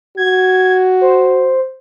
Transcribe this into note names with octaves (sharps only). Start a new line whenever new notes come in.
F#4 G#6
C5